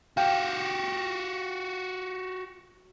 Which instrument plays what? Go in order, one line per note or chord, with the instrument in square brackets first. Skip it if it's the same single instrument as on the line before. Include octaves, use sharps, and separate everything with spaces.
[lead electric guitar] F#4 G4 [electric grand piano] F5 G5